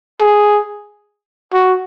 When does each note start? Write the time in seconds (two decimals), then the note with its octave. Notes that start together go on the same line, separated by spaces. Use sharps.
0.21 G#4
1.53 F#4